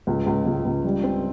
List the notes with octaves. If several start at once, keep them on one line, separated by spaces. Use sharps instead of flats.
C#2
C#2
C#2
C#2
G3
C4